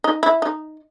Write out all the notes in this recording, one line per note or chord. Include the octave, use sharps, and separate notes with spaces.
D#4
E4
D#4